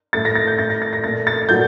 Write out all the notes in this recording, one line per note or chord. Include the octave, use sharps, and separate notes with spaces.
A2 A3 A6
A#6
A6
G6
A2 A3 A6
A#6
A6
A#6
A#2 A3 A6
A6
A#2 F#3 A3 G6